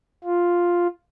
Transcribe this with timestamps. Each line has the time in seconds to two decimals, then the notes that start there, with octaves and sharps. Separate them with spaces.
0.24 F4